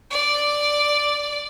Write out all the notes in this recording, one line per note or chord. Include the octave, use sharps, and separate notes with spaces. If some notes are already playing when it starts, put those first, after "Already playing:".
D5